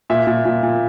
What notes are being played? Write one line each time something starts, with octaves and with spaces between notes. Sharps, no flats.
A#2 E5
A#2
A#2
A#2